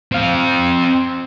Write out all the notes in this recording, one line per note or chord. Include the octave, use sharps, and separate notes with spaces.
C4 F5